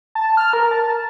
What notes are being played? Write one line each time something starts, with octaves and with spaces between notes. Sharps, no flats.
A5
F6
A#4
A5